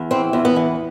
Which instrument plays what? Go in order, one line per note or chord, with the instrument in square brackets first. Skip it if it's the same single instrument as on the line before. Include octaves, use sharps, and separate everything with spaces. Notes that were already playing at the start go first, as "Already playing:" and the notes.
Already playing: [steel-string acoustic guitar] E2
E3 C4
E2
B3
E3